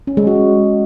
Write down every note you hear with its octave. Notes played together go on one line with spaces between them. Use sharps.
C#4
G#3
F#4